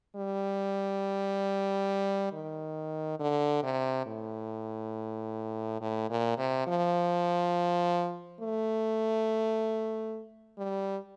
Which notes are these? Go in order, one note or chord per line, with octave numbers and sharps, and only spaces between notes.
G3
D#3
D3
C3
A2
A2
A#2
C3
F3
A3
G3